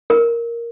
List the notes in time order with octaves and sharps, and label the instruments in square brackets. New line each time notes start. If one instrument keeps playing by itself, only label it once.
[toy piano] A#4